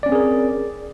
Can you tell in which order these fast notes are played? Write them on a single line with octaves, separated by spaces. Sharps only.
D5 C#4 C4 G#4 A#4